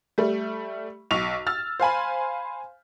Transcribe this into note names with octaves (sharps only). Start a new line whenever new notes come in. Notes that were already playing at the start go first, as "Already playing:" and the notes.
G3 A3
B1 C#6 F7
E6 F6 A6
C5 F5 G#5 B5